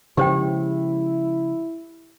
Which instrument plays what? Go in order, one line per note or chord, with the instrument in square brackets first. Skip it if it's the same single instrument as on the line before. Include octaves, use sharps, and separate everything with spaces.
[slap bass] C#3 F3 G#3 [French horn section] E4 [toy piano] G4 C5 G5